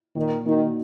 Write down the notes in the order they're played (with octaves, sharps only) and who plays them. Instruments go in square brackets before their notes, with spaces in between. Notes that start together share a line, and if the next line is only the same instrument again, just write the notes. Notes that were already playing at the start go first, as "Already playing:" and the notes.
[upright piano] A#2 [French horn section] D#3
[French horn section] D#3 [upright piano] A#3 D#4 F#4